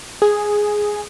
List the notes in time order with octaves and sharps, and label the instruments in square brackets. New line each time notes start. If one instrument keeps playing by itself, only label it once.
[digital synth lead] G#4